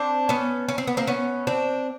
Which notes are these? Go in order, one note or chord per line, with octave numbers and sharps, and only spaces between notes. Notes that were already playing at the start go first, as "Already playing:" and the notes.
Already playing: C4 D4
B3 C#4
C#4
C4
B3
A#3 C4
B3 C#4
C4 D4